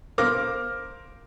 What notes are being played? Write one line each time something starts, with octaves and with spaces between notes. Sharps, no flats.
A#4 C5 F5 D6 F6 A#6